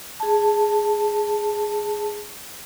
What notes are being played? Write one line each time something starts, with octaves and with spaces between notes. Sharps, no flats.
G#4 A5